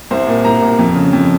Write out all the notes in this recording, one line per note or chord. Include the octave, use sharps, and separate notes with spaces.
C2 C5
A#2
C2 A#5
A#2
F2
C#3
F2